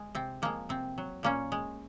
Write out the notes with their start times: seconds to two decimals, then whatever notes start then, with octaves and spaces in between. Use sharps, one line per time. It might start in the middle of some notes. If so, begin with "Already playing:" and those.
Already playing: G#3
0.15 C3 C4
0.42 F3 G#3 A#3
0.69 C3 C4
0.98 F#3
1.23 A#2 A#3 C#4
1.52 G#3